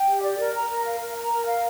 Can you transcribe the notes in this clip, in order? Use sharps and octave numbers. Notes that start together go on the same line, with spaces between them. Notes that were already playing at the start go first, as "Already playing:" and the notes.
Already playing: G5
G4
D5
A#4
A#5
A#4
F5
A#4
A#5
A#4
F5